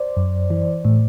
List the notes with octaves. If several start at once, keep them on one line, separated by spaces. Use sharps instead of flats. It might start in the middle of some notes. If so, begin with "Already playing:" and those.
Already playing: C5 D5
F#2
E3
A2